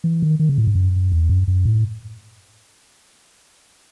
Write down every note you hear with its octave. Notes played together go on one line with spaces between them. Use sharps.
E3
D#3
D#3
C#3
A2
G#2
F#2
E2
F#2
F#2
A2